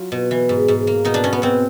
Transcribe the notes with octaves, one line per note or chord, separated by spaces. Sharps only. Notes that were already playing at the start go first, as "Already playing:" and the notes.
Already playing: F#3 F4
B2
E3
G#2
G#2
A#3
B2 D#4
D4
B2 C#4
B3
B2 C4